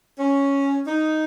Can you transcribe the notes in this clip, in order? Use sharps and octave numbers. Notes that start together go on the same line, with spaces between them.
C#4
D#4